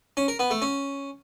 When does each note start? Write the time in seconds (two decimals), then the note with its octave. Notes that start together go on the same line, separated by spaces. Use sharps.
0.17 C#4
0.28 A#4
0.39 B3
0.51 A3
0.62 C#4